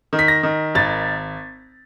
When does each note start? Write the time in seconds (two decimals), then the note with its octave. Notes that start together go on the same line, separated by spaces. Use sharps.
0.13 D#3
0.19 B6
0.28 A#6
0.43 D#3
0.75 G#1 A6